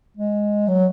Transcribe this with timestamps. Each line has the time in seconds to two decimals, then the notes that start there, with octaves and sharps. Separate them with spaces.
0.17 G#3
0.68 F#3